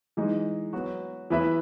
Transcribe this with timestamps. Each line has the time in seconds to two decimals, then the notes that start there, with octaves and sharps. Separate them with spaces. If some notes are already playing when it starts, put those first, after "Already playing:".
0.17 E3 G#3 D#4
0.73 F#3 B3 F#4
1.30 E3 B3 E4 B4 E5